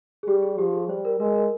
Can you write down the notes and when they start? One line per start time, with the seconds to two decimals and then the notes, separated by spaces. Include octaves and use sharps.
0.23 G#4
0.27 G3 G4
0.43 G#4
0.58 F3 G4
0.73 G#4
0.88 G3 C5
1.05 A#4
1.20 G#3 A#4
1.35 A#4